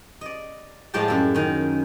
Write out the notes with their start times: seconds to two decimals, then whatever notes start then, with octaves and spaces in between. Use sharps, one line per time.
0.21 D5 D#5
0.94 A2 F3 G#3 D5 G5 A5
1.08 F#2 E5
1.34 D#3 C#4